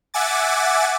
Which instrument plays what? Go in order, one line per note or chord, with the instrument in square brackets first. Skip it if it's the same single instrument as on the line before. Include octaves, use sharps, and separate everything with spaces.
[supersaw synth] E5 F#5 G#5 D6 A6